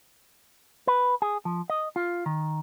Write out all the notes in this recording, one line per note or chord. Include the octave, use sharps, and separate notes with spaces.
B4
G#4
F3
D#5
F4
D#3